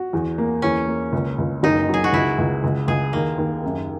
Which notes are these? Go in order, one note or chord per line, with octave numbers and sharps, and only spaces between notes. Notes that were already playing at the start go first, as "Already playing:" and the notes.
Already playing: F#4
E2
A#3
E2 C#4
A#3
C#2
C#2
F#1 D#4
F#3 G#4
F#4
C#2 E4
C#2
C#2
C#2 G#4
D#2 A#3
D#2
F#2